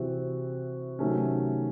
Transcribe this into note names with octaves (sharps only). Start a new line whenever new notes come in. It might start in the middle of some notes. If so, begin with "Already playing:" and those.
Already playing: C3 E3 C4 F#4
C3 D#3 F#3 A3 C#4